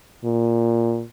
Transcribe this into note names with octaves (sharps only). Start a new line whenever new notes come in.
A#2